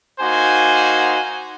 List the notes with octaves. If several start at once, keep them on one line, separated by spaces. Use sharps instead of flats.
A#3 D#4 F#4 C5 G#5